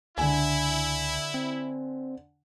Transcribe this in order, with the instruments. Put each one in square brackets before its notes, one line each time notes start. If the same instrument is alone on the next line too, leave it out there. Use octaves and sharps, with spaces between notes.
[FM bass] C#2 [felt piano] D3 G#5 [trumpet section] E4
[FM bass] C4